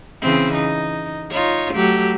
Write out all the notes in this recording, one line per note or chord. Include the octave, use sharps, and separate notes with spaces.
C#3 E3 C4
D#4
D#4 F4 C#5
F#3 A3 G4